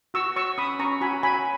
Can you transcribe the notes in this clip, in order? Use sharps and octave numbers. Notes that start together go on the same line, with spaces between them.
F#4 C#6 E6
C#5 C#6 E6
C#4 B5 D#6
C#4 A#5 C#6
F#4 G#5 B5
C#5 G#5 B5